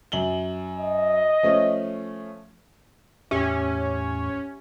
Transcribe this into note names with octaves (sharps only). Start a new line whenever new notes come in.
F#2 F#7 G7
D#5
F3 A3 C#4
E2 A2 C#4 G4 C#5 E5